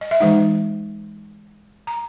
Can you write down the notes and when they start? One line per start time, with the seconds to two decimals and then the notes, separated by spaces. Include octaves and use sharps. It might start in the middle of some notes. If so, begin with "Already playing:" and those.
0.01 D#5
0.11 E5
0.20 E3 G#3 D#4 F#5
1.87 A#5